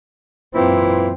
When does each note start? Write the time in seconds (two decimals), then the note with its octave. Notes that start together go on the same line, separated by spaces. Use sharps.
0.55 F#2 A#2 E3 C4 E4